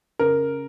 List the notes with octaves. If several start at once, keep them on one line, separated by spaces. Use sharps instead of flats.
C#3 A#4